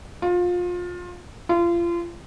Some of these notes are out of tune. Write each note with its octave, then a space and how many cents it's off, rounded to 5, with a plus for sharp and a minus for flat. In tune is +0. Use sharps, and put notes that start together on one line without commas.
F4 +25
F4 -30